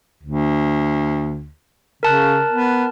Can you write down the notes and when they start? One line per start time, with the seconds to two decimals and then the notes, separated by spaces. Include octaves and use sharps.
0.24 D2
2.03 C#3 A#4 A5 F#6
2.51 B3